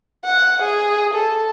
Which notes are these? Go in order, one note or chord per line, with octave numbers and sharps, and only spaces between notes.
F#5
G#4
A4